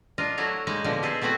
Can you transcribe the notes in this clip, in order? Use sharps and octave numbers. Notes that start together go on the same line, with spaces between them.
D4 F4 A#4 D#5
F#3 A3 E4 F#4 C#5
G#3 A#3 D#4
B2 D3 F3 A#3
G#4 A4 C5 D#5 E5
A3 B3 C4 E4 F#4